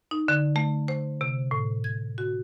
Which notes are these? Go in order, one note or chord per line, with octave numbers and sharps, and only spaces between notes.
D#4
D3
A3
C5
C3
A2
G#6
F#4